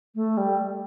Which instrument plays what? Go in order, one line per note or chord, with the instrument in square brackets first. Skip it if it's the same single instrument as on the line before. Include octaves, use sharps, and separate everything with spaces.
[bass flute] A3
G3